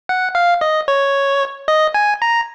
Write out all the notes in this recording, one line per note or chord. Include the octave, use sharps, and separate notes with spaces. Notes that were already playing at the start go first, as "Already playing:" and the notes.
F#5
F5
D#5
C#5
D#5
G#5
A#5